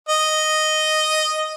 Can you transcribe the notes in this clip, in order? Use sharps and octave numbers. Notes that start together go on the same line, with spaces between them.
D#5